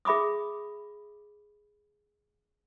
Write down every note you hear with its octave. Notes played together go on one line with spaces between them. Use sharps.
G#4 E5 B5 D6 D#6